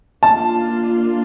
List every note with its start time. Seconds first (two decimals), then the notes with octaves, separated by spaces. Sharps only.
0.23 A#3 D4 F4 A5